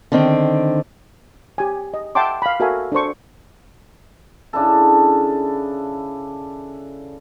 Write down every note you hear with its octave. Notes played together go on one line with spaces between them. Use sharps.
D3 D#3 C4
G4 G#5
D#5
E5 F#5 G5 A5 C6 D6
F5 B5
F#4 A4 A#4 E5 F5 G#5
D4 A4 C5 C#6
C#3 D4 E4 A4